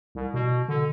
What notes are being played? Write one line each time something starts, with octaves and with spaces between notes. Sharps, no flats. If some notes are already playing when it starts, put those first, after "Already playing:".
C2
B2
D3